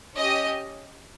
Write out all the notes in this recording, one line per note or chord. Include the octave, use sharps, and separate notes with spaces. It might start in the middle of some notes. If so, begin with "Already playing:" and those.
C#4 G4 D#5